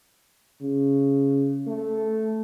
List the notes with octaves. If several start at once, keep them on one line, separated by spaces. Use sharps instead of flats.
C#3
A3